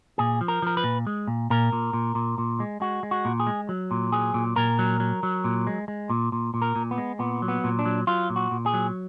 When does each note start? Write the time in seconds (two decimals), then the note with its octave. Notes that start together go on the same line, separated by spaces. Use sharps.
0.18 A#2 G#4
0.41 F3
0.48 A#4
0.62 F3 A#4
0.77 B4
0.84 A#2
1.07 G#3
1.27 A#2
1.50 A#2 A#4
1.73 A#2
1.93 A#2
2.15 A#2
2.38 A#2
2.60 G#3
2.81 G#3 F#4
3.03 G#3
3.11 F#4
3.25 A#2
3.40 G#4
3.47 G#3
3.69 F#3
3.91 A#2
4.12 F#3 G#4
4.34 A#2
4.56 A#2 A#4
4.79 F#3
5.00 F#3
5.23 F#3
5.44 A#2
5.67 G#3
5.88 G#3
6.10 A#2
6.32 A#2
6.54 A#2
6.62 A#4
6.76 A#2
6.91 B3
6.98 G#3
7.19 A#2 B3
7.42 F#3
7.48 B3
7.64 A#2
7.79 D4
7.85 F#3
8.07 F#3 F4
8.30 A#2
8.36 F#4
8.51 A#2
8.66 G#4
8.74 F#3